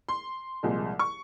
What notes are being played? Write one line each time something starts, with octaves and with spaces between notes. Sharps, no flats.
C6
C2 A#2 F3 G#3
C#6